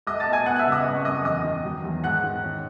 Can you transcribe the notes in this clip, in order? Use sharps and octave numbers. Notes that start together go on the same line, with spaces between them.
A3 D#5 D#6
A5 A6
B2
G#5 G#6
B3 F#5 F#6
F#6
E5 E6
C#3
D#5 D#6
G#1
C#6
F#2 D#5 D#6
E2 D#5 D#6
D#3
F#3
E2
G#2 F#5 F#6
D#3
C#4